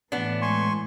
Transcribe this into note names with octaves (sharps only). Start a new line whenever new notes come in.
A2 E3 B3 D4
G#3 G#5 C6 C#6